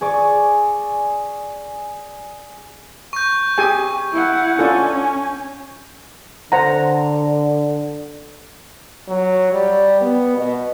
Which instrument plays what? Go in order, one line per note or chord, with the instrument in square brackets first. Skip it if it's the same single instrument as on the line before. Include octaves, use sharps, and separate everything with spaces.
[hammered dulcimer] G#4 D5 C#6
[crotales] C#6 G6
[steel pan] G4 G#4 G#5
[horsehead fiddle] E4 F#5
[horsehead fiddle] C#4 [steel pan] D4 F4 A4
[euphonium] D3 [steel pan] C5 F#5 A#5
[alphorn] F#3
G3
B3
B2